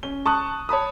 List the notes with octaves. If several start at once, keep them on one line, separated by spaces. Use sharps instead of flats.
C#4 G7
A5 C#6 D#6 F#6
C#5 A5 B5 D#6